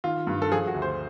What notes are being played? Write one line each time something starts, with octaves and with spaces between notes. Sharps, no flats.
D#3 F4
G2
A4
F3 G#4
F#4
D2
C5